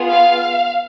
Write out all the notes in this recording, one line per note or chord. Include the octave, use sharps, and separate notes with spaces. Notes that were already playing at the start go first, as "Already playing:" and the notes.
Already playing: B3 F4 G#4
F5